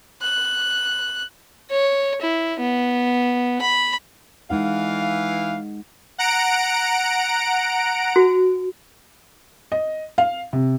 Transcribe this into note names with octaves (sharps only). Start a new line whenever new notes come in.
F#6
C#5
E4
B3
B5
E3 G#3 D#4 F5 F#5
F#5 A#5 D7
F#4
D#5
F5
C3